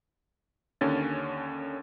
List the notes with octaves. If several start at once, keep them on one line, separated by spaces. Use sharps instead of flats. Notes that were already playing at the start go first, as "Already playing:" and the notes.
D#2 D3 C#4 A6